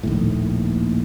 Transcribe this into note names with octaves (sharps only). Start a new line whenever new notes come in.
A#1 D#2 A2